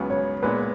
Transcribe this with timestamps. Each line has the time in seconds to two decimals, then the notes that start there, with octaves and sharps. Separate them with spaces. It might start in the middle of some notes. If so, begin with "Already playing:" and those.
Already playing: C#2 C#3 F#3 B3
0.10 C#5
0.43 A#2 G#3 B3 B4